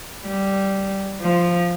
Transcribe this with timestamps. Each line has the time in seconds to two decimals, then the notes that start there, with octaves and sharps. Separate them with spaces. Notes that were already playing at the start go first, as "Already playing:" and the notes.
0.24 G3
1.21 F3